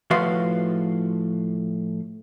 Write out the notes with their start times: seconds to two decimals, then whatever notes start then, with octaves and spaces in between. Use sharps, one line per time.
0.11 A2 F3 F#4 B4 F5 C6